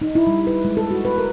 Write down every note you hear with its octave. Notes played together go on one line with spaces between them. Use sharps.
D#4
E4
G3
B4
G#3
A4
F#4
B4
A#4